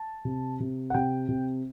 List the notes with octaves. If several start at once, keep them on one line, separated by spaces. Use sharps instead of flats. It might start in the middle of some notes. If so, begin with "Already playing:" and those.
Already playing: A5
C3
C3
F#5
C3 G5
C3